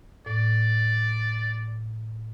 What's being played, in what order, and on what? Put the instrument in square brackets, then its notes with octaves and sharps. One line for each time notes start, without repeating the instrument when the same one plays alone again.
[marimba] A2 [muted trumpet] D5